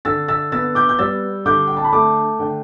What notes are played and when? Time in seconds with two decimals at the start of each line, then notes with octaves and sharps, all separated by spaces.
0.05 D3 E6 A6
0.28 E6 A6
0.52 B3 E6 A6
0.75 D6 G6
0.89 G6
0.99 G3 E6 A6
1.46 D3 D6 G6
1.67 G5
1.77 A5
1.84 B5
1.92 A3 A5 D6
2.39 D3 G5